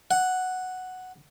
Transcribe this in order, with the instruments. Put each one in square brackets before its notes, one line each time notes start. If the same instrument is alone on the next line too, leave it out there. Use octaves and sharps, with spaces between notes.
[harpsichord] F#5